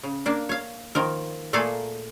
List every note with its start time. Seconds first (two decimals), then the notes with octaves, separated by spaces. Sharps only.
0.03 C#3
0.26 A#3 D4
0.49 C#5 F5
0.95 D#3 F3 A#4
1.53 A#2 A3 A#3 G#4 A4 F5